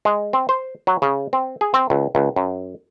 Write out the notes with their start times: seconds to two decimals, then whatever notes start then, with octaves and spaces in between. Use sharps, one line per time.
0.05 G#3
0.33 C4
0.49 C5
0.87 F#3
1.02 C#3
1.33 C4
1.61 G#4
1.74 C4
1.90 C#2
2.15 C#2
2.36 F#2